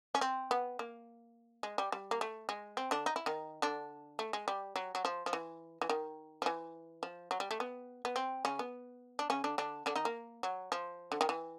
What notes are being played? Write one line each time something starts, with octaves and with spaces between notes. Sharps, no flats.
C#4
C4
B3
A#3
G#3
G3
G3
A#3
A3
G#3
C4
D3 D4
D#4
E4
D#3 D#4
D3 D4
A3
G#3
G3
F#3
F#3
F3
F3
E3
E3
D#3
F3
E3
F3
F#3
G3
A3
B3
B3
C4
C#3 C#4
B3
D4
C#3 C#4
D3 D4
D3 D4
D3 D4
D#3 D#4
A#3
F#3
F3
D3
D#3
E3